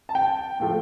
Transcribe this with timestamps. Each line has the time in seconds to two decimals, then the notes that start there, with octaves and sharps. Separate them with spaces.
0.09 A5
0.15 G5
0.60 A2 F3 A3